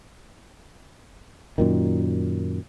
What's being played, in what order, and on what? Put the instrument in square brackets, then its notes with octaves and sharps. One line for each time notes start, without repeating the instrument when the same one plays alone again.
[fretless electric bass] F#2 A#2 D#3